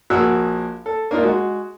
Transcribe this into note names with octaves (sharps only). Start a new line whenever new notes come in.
A#1 F#4 G#4 A#4 E6 F#6
A4
A#3 D4 D#4 F4
G#3 F#4